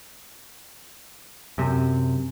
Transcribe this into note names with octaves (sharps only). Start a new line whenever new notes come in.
F#2 C3